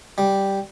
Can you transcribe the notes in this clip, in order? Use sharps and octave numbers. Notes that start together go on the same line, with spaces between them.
G3